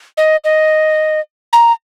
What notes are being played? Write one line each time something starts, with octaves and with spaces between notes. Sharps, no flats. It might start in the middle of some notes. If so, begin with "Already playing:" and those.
D#5
D#5
A#5